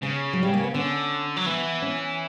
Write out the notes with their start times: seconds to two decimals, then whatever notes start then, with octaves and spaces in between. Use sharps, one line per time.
0.02 C#3 C#4
0.33 F#3
0.43 G3
0.54 A#3
0.64 B3
0.74 D3 C#4
1.36 F#3
1.46 E3 B3
1.82 C#4